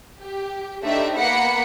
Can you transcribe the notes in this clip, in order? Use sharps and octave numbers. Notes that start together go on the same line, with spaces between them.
G4
A3 D4 D#4 G4 C5 E5
A#3 B3 F#5 B5 C#7